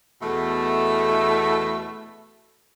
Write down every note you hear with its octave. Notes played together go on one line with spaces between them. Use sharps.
E2 B2 A3